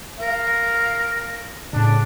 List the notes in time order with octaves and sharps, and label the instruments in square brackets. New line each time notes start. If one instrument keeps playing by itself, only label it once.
[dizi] A#4 [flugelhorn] F5
[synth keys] A2 C#3 [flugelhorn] D4